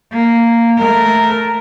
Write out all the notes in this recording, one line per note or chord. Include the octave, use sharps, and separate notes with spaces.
A#3
A3 A#4